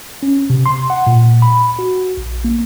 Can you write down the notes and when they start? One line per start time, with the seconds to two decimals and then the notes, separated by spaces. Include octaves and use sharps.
0.23 C#4
0.50 C3
0.66 C6
0.90 F#5
1.07 A#2
1.42 B5
1.79 F#4
2.17 A#1
2.44 A#3